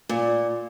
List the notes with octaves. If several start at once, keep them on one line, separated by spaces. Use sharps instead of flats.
A#2